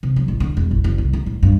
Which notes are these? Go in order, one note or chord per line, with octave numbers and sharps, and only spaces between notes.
C3
F#3
A1
D3
E1
A1
F#1
C2
D2
A2
G2